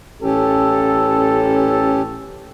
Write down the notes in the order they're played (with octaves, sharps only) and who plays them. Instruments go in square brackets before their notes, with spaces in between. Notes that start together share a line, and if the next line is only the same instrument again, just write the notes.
[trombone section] A1 A4 [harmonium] C#4 G4